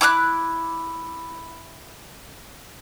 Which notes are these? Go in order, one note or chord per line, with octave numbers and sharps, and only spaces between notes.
E4 D6 E6 F#6